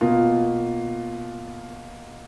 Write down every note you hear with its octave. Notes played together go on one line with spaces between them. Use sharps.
B2 A#3 F4